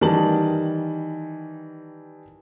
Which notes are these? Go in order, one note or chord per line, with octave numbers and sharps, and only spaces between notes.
D#3 E3 G3 A5 F#7